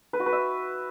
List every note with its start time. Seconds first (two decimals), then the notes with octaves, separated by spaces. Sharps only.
0.13 B4
0.20 F#4
0.26 B4
0.33 E5